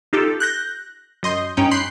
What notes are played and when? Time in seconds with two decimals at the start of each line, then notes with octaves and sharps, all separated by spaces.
0.13 D#4 F4 G4 A4
0.40 F#6 G6 A#6
1.23 F#2 D#5 C6 G6
1.57 G2 C#4 D#4 G5
1.71 B5 C6 F#6 G6 C7